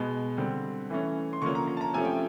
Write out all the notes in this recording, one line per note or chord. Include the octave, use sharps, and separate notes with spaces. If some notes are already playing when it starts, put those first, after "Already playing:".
Already playing: B2 G#3 B3
D3 G3 C4
E3 A3 C#4
C6
D3 F3 A#3 C#4 C#6
A#5
A#5
A5
A#5
C3 F3 A3 C#4 G#5
G5